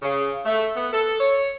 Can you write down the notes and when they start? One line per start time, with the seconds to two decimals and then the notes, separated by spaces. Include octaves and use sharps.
0.02 C#3
0.46 A3
0.77 B3
0.93 A4
1.20 C#5